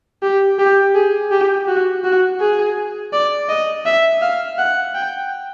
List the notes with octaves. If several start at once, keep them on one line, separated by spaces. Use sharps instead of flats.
G4
G4
G#4
G4
F#4
F#4
G#4
D5
D#5
E5
F5
F#5
G5